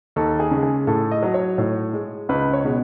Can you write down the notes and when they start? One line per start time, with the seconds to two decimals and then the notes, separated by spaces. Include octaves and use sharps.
0.16 D#2 A4
0.40 G#4
0.51 C#3
0.57 G#3
0.63 G#4
0.87 A2 A4
1.11 D#5
1.22 F#3
1.34 C#5
1.58 A2 C#5
1.93 G#3
2.29 C#2 B4
2.53 C#5
2.64 B2 G#3